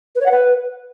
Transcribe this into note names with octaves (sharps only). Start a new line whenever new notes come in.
B4
C#5
F#5
B4